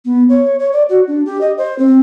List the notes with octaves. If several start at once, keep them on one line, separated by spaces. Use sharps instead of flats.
B3
C#5
C#5
D5
F#4
D4
G4
D#5
C5
C4